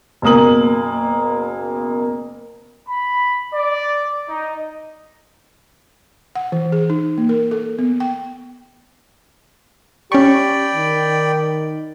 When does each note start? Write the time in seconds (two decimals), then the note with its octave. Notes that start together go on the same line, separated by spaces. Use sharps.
0.22 F#1 B2 A#3 D#6 F#7
2.88 B5
3.54 D5
4.28 D#4
6.36 F#5
6.52 E3
6.72 G#4
6.90 D#4
7.18 A#3
7.29 A#4
7.51 A4
7.79 B3
8.00 G5
10.12 C#4 G4 D5 G5 B5 C#6
10.75 D#3